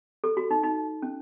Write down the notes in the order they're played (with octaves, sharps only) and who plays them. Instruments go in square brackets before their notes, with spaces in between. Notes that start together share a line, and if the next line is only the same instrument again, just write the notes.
[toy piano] A4
F#4
D#4
D#4
C#4